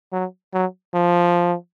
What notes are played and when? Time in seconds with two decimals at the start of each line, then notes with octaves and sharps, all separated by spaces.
0.12 F#3
0.53 F#3
0.94 F3